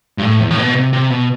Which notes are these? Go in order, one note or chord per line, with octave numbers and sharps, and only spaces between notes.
G2
A2
E2
A2
B2
C3
C3
B2